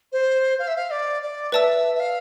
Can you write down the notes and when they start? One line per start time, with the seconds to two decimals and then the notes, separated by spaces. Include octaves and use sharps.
0.12 C5
0.59 F5
0.68 E5
0.76 F5
0.90 D5
1.22 D5
1.52 B4 D5 E5 A5 E6
1.95 E5
2.00 F5